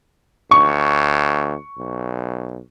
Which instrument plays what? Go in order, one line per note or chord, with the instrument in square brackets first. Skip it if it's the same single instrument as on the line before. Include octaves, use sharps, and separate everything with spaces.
[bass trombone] D2 [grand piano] C#6
[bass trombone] B1